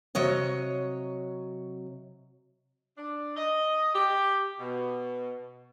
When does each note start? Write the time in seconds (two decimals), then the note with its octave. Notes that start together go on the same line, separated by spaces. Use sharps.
0.15 C3 F#3 C#5 D#5
2.97 D4
3.37 D#5
3.94 G4
4.59 B2